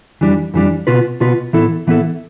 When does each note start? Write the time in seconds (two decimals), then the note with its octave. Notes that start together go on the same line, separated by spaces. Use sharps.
0.21 F2 E3 G3 D4
0.54 F2 E3 G3 D4
0.87 B2 B3 F4 B4
1.21 B2 B3 F4 B4
1.53 A2 E3 B3 E4 A4
1.87 A2 E3 B3 E4 A4